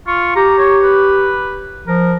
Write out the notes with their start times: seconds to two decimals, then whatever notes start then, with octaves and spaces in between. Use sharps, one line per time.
0.07 F4 C#6
0.36 G4 A#5
0.58 C#5
0.83 B4
1.87 F3 A#4